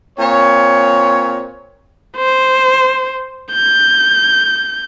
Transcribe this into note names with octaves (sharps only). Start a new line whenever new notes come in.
A#2 C4 C#5
C5
G6